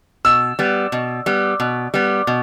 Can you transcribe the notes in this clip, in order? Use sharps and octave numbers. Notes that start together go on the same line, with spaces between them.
B2 E6
G3 B3
B2
G3 B3
B2
G3 B3
B2